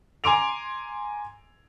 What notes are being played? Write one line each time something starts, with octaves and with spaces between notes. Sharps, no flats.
G#5 A#5 C6 D6 D7 F7